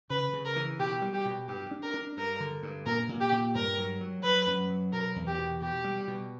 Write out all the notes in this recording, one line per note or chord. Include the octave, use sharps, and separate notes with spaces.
C#3 B4
C#3
A#4
E3
B2 G4
G3
G4
B2
G2 G4
D4
A#4
D4
G2 A#4
D3
G2
A#2 A#4
A#2
G4
A#2
G2 A#4
F#3
F#3
F#3 B4
F#2
F#3
B2 A#4
E2
G4
B2
B2 G4
G3
B2